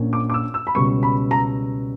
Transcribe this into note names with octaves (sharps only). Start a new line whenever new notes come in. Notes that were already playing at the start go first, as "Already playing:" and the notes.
Already playing: A#1 A#2 A#3 C#4
D6
D6
E6
E6
B5
C#2 B2 G3 C#4 C#6
B5
A#5